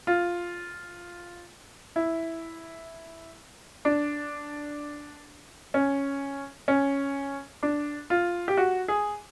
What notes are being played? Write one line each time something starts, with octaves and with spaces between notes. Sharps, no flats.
F4
E4
D4
C#4
C#4
D4
F4
G4
F#4
G#4